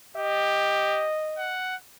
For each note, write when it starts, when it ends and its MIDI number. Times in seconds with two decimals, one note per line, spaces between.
0.17 1.09 67
0.17 1.55 75
1.38 1.76 78